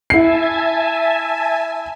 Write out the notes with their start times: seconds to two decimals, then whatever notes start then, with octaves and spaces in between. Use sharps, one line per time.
0.10 E4 E5 G#5 A5 C7